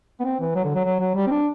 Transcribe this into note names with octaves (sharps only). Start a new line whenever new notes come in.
B3
C4
E3
F#3
D3
F#3
F#3
F#3
G3
C4
D4